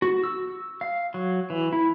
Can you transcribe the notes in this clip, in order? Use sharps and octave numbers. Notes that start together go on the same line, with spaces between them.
F#4
E6
F5
F#3
E3
E4